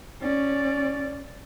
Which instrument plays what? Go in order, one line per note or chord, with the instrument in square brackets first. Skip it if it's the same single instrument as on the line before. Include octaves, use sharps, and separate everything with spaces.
[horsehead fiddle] C#4 D5